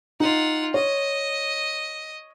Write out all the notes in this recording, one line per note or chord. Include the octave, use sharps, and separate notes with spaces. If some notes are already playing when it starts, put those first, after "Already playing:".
D#4 F4 F#5
C#5 D#5